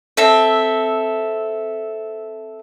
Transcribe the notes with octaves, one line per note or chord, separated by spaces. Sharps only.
C4 A4 E5